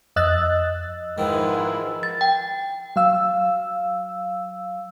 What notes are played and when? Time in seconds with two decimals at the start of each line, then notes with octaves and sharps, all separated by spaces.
0.16 F2 D#5 E6 F#6 A6
1.18 G#2 D#3 F3 G#3 E4 B4 B5
2.03 A6
2.21 G5
2.96 F#3 F5 E6